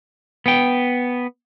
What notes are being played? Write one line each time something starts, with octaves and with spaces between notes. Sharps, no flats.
B3 G5